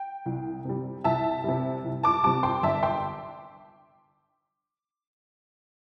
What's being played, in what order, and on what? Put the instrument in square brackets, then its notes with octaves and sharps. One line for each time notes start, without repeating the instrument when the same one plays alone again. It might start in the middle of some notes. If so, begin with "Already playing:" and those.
Already playing: [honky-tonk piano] G5
C2
C3 G3
C2 E5 A5
C3 G3
C2
A5 D6
C3 G3 A5 D6
G5 C6
G1 E5 A5
G5 C6